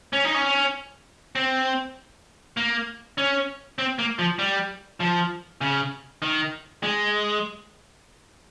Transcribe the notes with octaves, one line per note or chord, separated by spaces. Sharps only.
C#4
D#4
C#4
C4
A#3
C#4
C4
A#3
F3
G3
F3
C#3
D#3
G#3